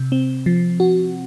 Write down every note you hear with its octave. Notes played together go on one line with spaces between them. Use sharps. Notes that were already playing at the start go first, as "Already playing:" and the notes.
Already playing: C3
C4
F3
F#4